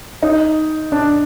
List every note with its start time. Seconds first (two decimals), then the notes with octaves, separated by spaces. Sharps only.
0.22 D#4
0.92 D4